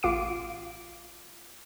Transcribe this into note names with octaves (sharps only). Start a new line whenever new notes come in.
A1 F4 F5 D6 C7 D7